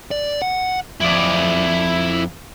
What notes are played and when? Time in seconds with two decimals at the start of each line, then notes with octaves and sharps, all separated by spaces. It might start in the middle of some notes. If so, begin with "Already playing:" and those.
0.11 D5
0.42 F#5
1.00 F2 E4 D5